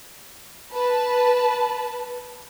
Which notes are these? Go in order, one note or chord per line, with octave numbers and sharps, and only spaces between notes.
B4 A5